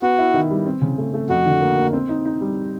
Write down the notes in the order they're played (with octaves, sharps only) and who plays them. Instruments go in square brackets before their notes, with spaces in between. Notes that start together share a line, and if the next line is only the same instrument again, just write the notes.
[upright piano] B3 [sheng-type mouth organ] F#4
[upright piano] E4
D#3
G3
C4
C#3
A3
A3
[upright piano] F2 [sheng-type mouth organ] F#4
[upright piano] D3
A#3
A#3
C4
D#4
D#4
G3